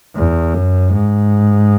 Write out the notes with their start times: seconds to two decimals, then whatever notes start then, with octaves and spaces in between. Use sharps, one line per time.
0.16 E2
0.54 F#2
0.93 G#2